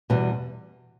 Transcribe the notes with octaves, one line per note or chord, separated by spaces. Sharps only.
E2 B2 G3 B3